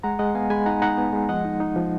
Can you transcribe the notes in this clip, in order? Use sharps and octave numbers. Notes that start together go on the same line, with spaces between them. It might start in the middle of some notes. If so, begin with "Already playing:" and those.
G#3 F#5 A#5
G#3 D#5 F#5
B3 F5 G#5
G#3 G#5 B5
D#4 F#5 A#5
D#4 F#5 A#5
B3
G#3
F3 D#5 F#5
D#4
D#4
F3